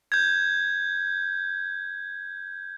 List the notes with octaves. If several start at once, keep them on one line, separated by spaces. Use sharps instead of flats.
G6 G#6